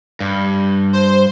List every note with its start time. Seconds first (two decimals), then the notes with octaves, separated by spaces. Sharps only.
0.20 G2
0.93 C5